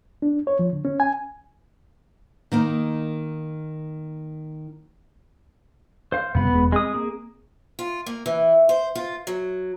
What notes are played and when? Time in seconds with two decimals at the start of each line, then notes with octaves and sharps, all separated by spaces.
0.22 D4
0.47 C#5
0.59 F3
0.73 D3
0.85 C#4
1.00 G#5
2.52 D#3 A#3 D#4
6.12 C5 F5
6.35 F#2 C3 G3 B3 B5
6.50 E1 G#3
6.72 G#3 C4 D#6
6.94 A#3 G#4
7.79 F4
8.06 A#3
8.26 E3
8.69 C5
8.95 F4
9.27 F#3